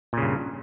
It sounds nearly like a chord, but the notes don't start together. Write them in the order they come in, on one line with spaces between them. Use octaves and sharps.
A#2 C#3 G2